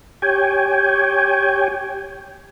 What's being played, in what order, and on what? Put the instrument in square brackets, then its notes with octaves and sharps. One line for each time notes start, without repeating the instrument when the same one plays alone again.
[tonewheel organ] G4 C#5 G5 G#5